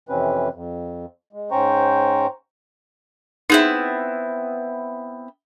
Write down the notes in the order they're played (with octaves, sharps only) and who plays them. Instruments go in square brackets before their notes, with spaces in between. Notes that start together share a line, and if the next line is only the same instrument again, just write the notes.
[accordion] F2 C3 E3 C4 C#4 B4
F2
G#3
G#2 C#4 C5 G5 A#5 C#6
[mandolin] B3 C4 E4 [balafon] D#4 G#4